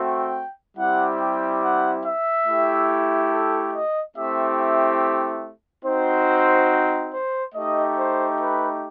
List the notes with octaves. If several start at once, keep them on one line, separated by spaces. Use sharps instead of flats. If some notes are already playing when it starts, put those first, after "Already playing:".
Already playing: A3 C4 F#4 G5
G3 C4 E4 G4 F#5
G5
F#5
E5
A3 E4 G4
A4
D#5
A3 C4 E4 G4 E5
E5
C4 D#4 F#4 C5
C5
A3 D#4 G4 D#5
C5
B4